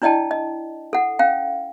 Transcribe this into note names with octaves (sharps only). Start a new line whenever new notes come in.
D4 E4 D5 D#5 G5 A5
D#5
A4 F#5
C#4 F5 G5